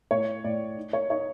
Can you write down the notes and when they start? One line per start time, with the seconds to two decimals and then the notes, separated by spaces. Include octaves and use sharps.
0.11 A2 C#5
0.44 A2 D5
0.77 D#4
0.93 C#5
1.10 D#4 C#5